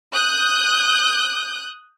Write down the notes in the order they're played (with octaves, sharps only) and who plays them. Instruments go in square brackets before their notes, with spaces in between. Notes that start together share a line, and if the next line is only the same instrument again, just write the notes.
[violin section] D#6 F#6 G6